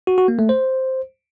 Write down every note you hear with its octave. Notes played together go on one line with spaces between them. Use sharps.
F#4
F#4
A#3
A3
C5